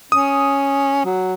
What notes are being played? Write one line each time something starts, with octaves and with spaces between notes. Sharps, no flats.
C#4 D#6
F#3